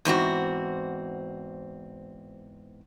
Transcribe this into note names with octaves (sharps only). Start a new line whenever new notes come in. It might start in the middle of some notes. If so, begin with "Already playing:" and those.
E2 G#2 C4 F#4